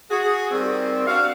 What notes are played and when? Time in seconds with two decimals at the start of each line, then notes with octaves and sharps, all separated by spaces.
0.10 F#4 G#4
0.51 D#3 G3 C4
1.07 D4 F#4 F5